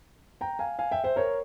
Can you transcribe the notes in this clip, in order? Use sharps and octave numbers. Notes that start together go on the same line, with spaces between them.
G5 A#5
F5 G#5
F5 G#5
E5 G5
C5 E5
A#4 C#5